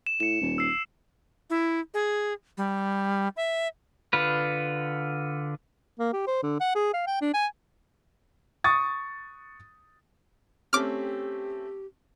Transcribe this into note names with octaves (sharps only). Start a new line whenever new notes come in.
E7
A2 C#7 E7
D#1
E6 C7
E4
G#4
G3
E5
D3 F4 B4
A#3
G4
C5
D3
F#5
G#4
F5
G5
D4
G#5
C#6 D#6 A6
A3 C4 C#4 G4 D6 F6